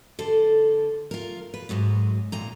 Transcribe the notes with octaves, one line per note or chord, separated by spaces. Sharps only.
D3 A4 C5
F4 A#4
B4
D2 G#2 F#3 B3
D2 A#2 A#5